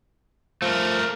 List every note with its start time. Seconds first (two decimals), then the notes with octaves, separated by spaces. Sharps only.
0.62 F3 A3 A#4